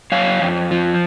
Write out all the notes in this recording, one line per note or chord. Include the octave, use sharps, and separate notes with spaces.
F#2 C#5 F5
F2
F3